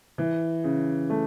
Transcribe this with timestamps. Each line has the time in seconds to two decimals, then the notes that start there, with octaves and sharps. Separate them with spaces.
0.18 E3
0.64 C#3
1.10 A3